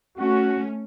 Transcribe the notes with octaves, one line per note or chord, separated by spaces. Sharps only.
A3 C#4 F#4